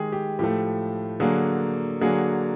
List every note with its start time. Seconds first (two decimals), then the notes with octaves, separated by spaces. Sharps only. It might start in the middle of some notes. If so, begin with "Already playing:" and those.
Already playing: D#3 G#3 G4 G#4
0.12 G4
0.39 A2 F3 A3 G4
1.20 D3 F#3 A#3 G#4
2.01 D3 F#3 A#3 G#4